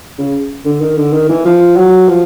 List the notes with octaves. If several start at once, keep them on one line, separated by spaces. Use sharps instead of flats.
C#3
D3
D#3
D3
D#3
E3
F3
F#3
F3